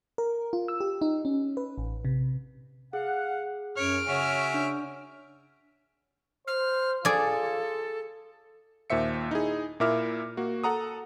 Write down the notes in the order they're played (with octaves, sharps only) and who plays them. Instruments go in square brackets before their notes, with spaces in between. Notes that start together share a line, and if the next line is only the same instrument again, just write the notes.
[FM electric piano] A#4
F4
E6
G4
D#4
C#4
B4
A1
C3
[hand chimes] G#4 [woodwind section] F5 F#5
[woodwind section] F#2 [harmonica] C#5 [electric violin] F6 D7
[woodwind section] C#3 C#5 [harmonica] C#4 F#4 E5
[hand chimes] D4
[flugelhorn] C5 [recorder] F6
[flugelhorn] F4 [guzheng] G#4 D5 [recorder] A4
[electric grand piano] D#2 A#2 C5 E5 C#7
D#4 E4 G#4
A#2 E4 A#4 E5 D6 F6
A#3 F#4
A4 F#5 A#5 D#6